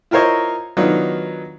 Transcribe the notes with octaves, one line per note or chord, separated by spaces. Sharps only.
E4 F4 A#4 C5 C#5 D#5
D#3 F#3 B3 D4 D#4 F4